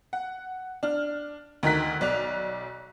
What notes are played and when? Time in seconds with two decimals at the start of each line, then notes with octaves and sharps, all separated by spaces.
0.13 F#5
0.83 D4 F6
1.63 D2 D#3 A#5 F#6 B6
2.01 B1 D5 F#6 F7